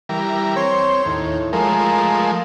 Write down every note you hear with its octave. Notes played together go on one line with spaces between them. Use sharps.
E3 G3 A#4
C4 C#5
D#2 A2
F3 G#3 A3 A#4